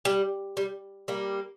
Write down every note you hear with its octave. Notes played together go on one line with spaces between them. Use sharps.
G3
G3
G3 A#3